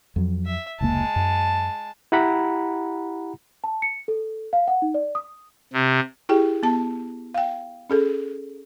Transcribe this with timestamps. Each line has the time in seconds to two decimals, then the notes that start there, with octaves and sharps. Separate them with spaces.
0.16 F2 F#3
0.46 E5
0.81 F1 C#2 G#3 A#3 A5
1.16 F#2
2.12 E4 G4 F#5 A#5 B5
3.64 A5
3.82 C#7
4.08 A4
4.53 F5
4.68 F#5
4.82 D#4
4.94 D5
5.15 D#6
5.73 C3
6.29 E4 G4 G#4 G5
6.63 B3 A5
7.34 F5 G5
7.90 C#4 G#4 A4